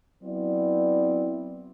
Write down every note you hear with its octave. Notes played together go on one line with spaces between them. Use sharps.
F#3 B3 C4 E4 D5